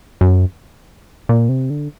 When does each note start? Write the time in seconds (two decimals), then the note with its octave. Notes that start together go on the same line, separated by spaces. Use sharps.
0.21 F#2
1.29 A#2
1.49 C3
1.70 D3